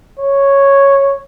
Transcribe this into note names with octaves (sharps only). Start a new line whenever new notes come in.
C#5